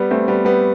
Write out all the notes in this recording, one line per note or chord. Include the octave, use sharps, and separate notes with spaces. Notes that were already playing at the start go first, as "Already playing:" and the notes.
Already playing: G3 B3
A3 C4
G3 B3
G3 B3